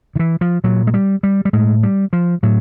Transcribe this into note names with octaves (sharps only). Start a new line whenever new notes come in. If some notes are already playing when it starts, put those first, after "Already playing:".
D#3
E3
F3
A#2 F#3
G#3
G3
G3
G3
A2 G#3
G3
F3
A2 F#3